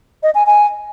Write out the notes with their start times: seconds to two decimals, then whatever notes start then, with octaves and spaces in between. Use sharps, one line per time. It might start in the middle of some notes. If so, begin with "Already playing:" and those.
0.23 D#5
0.35 G#5
0.46 G#5